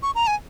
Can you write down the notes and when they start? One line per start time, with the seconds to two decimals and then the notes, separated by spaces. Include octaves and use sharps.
0.03 C#6
0.15 A#5
0.27 G#5